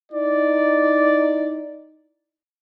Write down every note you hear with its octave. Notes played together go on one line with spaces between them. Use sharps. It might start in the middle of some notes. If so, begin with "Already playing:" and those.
D#4 E4 D5